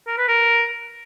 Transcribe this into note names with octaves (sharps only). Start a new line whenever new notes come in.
A#4
B4
A#4